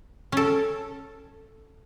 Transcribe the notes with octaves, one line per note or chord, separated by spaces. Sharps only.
C#4 A4